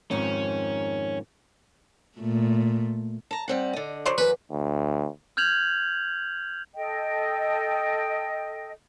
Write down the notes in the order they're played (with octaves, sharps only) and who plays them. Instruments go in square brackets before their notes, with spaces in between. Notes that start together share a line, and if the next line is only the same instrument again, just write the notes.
[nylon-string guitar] F2 G#2 D#3 [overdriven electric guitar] C#4
[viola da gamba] A#2 A3
[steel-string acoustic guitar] A5 A#5
G3 C4 F#5
D3 D#5
[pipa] F#3 C5 D5
[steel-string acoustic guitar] F#2 F#4 [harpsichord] B4
[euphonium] D2
[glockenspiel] F6 G6 G#6 F7 F#7
[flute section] A4 D#5 G5